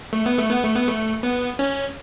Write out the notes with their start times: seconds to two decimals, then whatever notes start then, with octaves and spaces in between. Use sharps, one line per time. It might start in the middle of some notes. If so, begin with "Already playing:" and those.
0.13 A3
0.26 B3
0.38 A3
0.50 B3
0.63 A3
0.75 B3
0.88 A3
1.23 B3
1.59 C#4